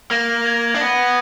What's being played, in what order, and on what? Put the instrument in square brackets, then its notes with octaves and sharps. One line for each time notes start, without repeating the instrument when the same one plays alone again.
[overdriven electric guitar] A#3 [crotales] A#6
[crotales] G#6
A#6
G#6
[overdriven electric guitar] D4
[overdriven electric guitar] B3 [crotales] A#6